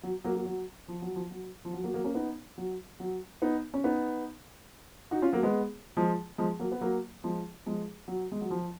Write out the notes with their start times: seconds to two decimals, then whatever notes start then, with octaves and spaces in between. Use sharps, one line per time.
0.03 F#3
0.24 F#3 A#3
0.35 F#3 A#3
0.45 F#3
0.88 F3
1.02 F#3
1.15 F3
1.31 F#3
1.65 F3
1.73 F#3
1.83 F#3 A#3
1.94 F#3 A#3
2.04 A#3 C#4
2.15 B3 D#4
2.58 F#3
3.00 F#3
3.42 B3 D#4
3.74 C#4
3.84 B3 D#4
5.11 D#4 F#4
5.22 C#4 F4
5.33 F#3 A#3
5.43 G#3 B3
5.97 F3 G#3
6.38 F3 G#3
6.59 F#3 A#3
6.72 B3
6.81 F#3 A#3
7.24 F3 G#3
7.66 F3 G#3
8.08 F#3
8.32 G#3
8.41 F#3
8.51 F3